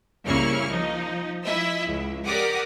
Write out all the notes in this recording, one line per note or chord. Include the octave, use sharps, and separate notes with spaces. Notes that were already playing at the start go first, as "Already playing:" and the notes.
C2 C#3 A#3 E4 C#6 F6
F3 D#4
F3 E4 D#5 E5 E6
C#2
G4 A#4 D5 F#5 D6 D#6